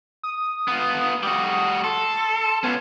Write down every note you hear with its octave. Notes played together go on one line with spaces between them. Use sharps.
D#6
B3 F4
G3 F#4
A4 C6
B3 C#4 F4